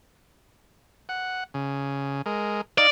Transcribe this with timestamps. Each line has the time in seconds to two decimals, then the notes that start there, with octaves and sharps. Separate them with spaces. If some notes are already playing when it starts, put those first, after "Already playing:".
1.09 F#5
1.54 C#3
2.26 G#3 A#4
2.78 D#4 D5 F5 A#5